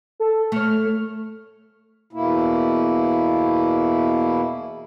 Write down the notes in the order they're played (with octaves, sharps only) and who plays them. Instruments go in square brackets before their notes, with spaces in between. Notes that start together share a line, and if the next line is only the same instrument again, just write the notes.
[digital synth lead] A4
[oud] A3 C#5 [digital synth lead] F6
[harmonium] E2 B2 A#3 E4